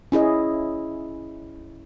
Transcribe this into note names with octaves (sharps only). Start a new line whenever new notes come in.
C#4 E4 G#4 D#5